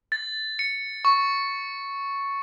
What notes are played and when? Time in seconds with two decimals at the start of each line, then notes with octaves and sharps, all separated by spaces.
0.12 A6
0.59 C#7
1.05 C#6